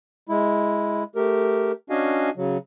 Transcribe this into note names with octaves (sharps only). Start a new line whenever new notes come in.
G#3 E4
A3 G4 A#4
C#4 D4 F#4 D#5 F5 G#5
C#3 F#3